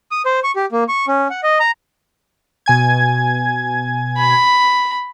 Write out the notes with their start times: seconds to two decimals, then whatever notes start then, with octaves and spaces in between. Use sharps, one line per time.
0.11 D#6
0.26 C5
0.44 C#6
0.56 G4
0.72 A#3
0.88 C#6
1.08 C#4
1.30 F#5
1.43 D#5
1.60 A#5
2.66 B2 G#5 G#6
4.18 B5